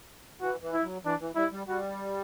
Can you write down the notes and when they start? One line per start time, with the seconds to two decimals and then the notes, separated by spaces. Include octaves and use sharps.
0.41 E3 F#4
0.62 E3
0.73 E4
0.83 F#3
1.04 E3 D4
1.20 E3
1.36 G3 E4
1.52 G3
1.68 G3 F#4